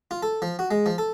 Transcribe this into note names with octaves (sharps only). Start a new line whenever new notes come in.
F4
A4
F3
F#4
G#3
F3
A4